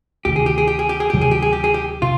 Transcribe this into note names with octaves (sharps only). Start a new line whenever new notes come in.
D2 C3 D#3 G4
G#4
G4
G#4
G4
G#4
G4
G#4
D2 C3 D#3 F#3 G4
G#4
G4
G#4
G4
G#4
G4
C3 F4